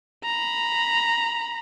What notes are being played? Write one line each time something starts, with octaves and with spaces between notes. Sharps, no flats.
A#5 B5